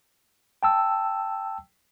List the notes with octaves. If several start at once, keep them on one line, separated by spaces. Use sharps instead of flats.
G5 A5 E6